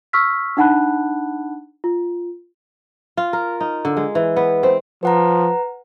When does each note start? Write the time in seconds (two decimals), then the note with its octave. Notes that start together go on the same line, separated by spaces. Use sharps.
0.13 C#6 E6 F6 B6
0.57 D4 D#4 F#5 A5 B5 F#6
1.84 F4
3.17 F4
3.33 A#4
3.61 D#4
3.85 D3
3.97 G#3
4.15 E3
4.36 B3
4.63 C4
5.03 F3 B4 F#5 A#5